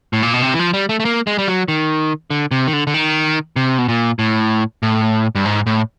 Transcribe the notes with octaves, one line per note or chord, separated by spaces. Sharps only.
A2
A#2
B2
C3
E3
F3
G3
A3
A3
A#3
G#3
G3
F#3
D#3
D3
C3
D#3
D3
D3
D#3
C3
B2
A#2
A2
A2
G2
G#2
A2